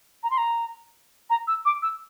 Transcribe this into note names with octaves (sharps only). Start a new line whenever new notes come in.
A#5
C6
A#5
A#5
E6
D6
E6